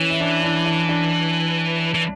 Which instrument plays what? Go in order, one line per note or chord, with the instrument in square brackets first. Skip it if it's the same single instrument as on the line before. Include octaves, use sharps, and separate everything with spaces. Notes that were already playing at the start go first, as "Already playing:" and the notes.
Already playing: [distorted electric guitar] E3 [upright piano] C#4
[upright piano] E4
D4
D4
D4
D4
[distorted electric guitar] E3